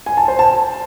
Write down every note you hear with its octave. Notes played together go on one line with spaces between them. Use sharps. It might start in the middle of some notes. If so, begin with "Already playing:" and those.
G#5
A5
C5
A5